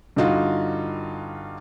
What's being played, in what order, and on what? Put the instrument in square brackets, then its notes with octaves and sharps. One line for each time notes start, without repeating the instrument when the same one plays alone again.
[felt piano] G2 D3 D#4 F4 F#4